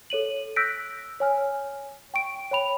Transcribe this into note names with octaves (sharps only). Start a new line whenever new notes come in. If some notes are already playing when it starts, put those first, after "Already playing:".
A4 C#5 D#7 F#7
E6 F#6 G6 A#6 B6 D7
C#5 G#5 F6
G5 C#6 D7
C#5 G5 B5 F7